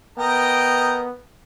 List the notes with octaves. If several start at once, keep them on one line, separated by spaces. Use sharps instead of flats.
B3 A#4 D#5 G5 A#5